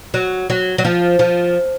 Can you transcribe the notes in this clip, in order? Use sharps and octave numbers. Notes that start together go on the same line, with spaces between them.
F#3
F#3
F#3
F3
F3